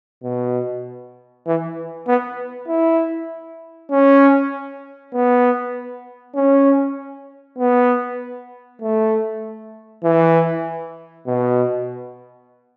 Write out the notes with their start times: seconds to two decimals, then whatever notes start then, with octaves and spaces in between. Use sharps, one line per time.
0.23 B2
1.46 E3
2.07 B3
2.68 E4
3.91 C#4
5.14 B3
6.35 C#4
7.58 B3
8.82 A3
10.04 E3
11.26 B2